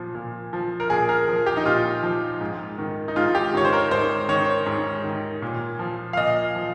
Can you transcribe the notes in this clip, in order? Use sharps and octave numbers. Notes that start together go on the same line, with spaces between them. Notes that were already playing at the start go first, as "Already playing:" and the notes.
Already playing: A#2 F3
A#2
F3
A#4
A#2 G#4
A#4
F3
G4
D#4
A#2 F4
F3
G#2
D#3
D#4
G#2 F4
G4
D#3 C#5
C5
A#4
G#2 C5
D#3 C#5
G#2
D#3
A#2
F3
F5
A#2 D#5
F3